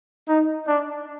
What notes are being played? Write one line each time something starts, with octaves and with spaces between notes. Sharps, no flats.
D#4
D4